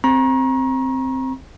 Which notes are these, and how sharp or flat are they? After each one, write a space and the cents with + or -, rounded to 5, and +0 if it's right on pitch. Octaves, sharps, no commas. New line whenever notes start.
C4 +0 A#5 +30 C#6 -35